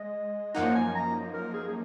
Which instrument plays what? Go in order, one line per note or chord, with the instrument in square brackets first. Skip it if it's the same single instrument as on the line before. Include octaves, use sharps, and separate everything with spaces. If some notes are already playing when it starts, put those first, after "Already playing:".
Already playing: [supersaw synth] G#3 [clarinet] D#5
[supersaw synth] F#2 F3 A#3 D#4 [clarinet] F#5
[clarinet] G#5
A#5
A#4
G#4
G#4